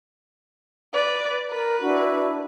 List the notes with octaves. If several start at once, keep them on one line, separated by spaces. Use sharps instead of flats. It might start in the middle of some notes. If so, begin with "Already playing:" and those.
B4 D5
A#4 B4
D4 E4 F#4